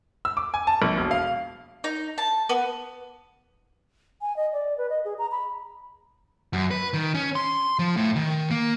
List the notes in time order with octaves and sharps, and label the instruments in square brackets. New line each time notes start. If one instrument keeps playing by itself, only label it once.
[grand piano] E6
D6
G#5
A5
A#1
E1
F5
[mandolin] D#4
A5
B3
[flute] G#5
D#5
D5
B4
D#5
G#4
A#5
B5
[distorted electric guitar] F#2
B4
D#3
C#4
C6
F3
A2
D#3
A#3